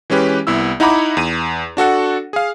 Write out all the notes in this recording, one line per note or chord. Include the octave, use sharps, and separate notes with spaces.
E3 G#3 C#4 G4 B4
C2 B3 E4 E6
D#4 E4 F#5 A#5 B5 D6
E2 D#7
D4 F#4 A4 F#5
G#4 F5